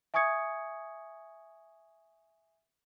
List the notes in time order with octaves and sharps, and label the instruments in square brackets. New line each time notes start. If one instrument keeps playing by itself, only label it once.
[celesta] E5 G#5 C#6 D#6 G#6 C#7